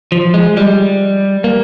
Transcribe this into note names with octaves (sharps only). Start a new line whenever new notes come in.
F3
G#3
G3
A#3